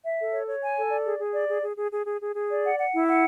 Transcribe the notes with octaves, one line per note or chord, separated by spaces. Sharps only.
E5
A4
C#5
C#5
G#5
A4
D5
G#4
G#4
D5
G#4
G#4
G#4
G#4
G#4
G#4
G#4
D5
F#5
F#5
E4
F#5